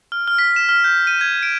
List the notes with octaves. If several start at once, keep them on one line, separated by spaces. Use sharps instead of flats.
F6
F6
B6
E7
F6
G6
D#7
G#6
D7